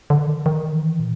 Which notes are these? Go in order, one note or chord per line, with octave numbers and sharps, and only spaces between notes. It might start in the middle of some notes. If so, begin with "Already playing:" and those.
D3
D#3
D#3
E3
A#2